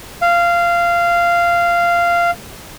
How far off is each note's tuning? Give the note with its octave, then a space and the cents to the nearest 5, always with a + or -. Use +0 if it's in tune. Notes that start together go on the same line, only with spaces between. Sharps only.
F5 -15